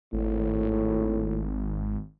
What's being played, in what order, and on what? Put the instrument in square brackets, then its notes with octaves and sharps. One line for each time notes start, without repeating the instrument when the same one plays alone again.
[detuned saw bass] G#1 [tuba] A2